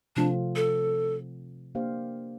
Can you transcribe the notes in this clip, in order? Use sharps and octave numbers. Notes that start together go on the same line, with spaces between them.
C3 F3 A3 C4 D4 F4
A4
A#3 D4 G4 C5 F5